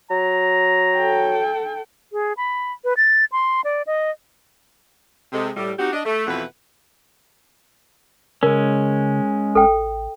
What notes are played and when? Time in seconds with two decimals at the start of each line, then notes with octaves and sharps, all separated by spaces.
0.10 F#3 A#5
0.96 A4 G5
2.13 G#4
2.37 B5
2.84 B4
2.97 A6
3.32 C6
3.64 D5
3.87 D#5
5.33 C3 G#3 A4
5.56 A2 G3
5.79 C4 D#4 F#4 G4
5.93 D4 D#5
6.05 A3
6.27 F2 B2 E3 B4 E5 F#5
8.43 C#3 G#3 C#4 A#4
9.55 A1 A4 G5